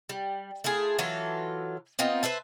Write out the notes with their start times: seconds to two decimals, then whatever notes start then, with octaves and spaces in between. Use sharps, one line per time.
0.09 G3
0.64 A3 E4 F4 G#4
0.99 E3 F#3 F4 A4
1.99 B3 C4 D#4 F4
2.23 B4 C5 E5 A5